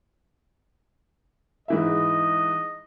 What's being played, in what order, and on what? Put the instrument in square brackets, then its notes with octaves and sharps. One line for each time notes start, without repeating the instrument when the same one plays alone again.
[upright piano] G#2 E3 E5 [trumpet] D#5